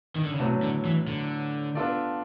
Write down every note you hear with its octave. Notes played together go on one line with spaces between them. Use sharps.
D#3
D3
C#3
A2 C3 F#3 B3 D4
D3
E3
D3
B3 D4 F4 A4 D5